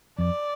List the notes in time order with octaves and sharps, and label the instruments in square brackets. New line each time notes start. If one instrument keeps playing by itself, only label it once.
[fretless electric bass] F2 [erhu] D5